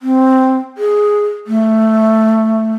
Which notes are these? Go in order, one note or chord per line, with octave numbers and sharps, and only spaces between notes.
C4
G#4
A3